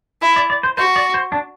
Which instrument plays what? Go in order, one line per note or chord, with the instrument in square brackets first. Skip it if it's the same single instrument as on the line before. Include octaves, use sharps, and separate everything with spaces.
[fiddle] E4
[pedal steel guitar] D5
D5
C5
[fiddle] F#4 [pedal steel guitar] C5
[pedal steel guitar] D5
C5
D4